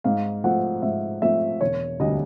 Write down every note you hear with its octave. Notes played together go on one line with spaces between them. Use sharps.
G#2 F5
F3 A3 F#5
G#2 E5
F3 A3 E5
E1 C#5
D2 D3 G3 D#5